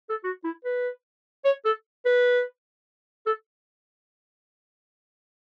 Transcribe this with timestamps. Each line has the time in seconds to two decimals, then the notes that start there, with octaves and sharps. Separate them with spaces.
0.10 A4
0.24 F#4
0.44 E4
0.65 B4
1.45 C#5
1.65 A4
2.06 B4
3.27 A4